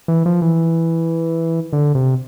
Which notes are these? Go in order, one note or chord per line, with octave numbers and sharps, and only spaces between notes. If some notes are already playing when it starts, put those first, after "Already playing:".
E3
F3
E3
D3
C3